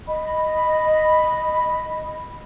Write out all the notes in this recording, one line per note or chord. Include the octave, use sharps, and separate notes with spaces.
D#5 B5